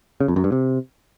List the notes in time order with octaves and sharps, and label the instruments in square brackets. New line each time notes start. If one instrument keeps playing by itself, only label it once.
[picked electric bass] C#3
F2
F#2
G2
C3